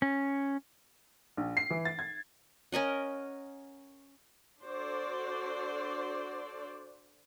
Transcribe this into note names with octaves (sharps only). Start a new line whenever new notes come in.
C#4
A#1
C7
E3
A6
G#6
C#4 A#4 D#5 F#5
D4 F#4 A4 C5 D5